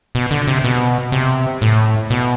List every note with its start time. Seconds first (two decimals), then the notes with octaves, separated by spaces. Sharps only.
0.15 B2
0.31 D3
0.47 C3
0.64 B2
1.12 C3
1.61 A2
2.10 B2